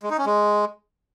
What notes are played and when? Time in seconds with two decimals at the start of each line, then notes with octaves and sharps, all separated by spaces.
0.03 G#3
0.10 D#4
0.18 C#4
0.26 G#3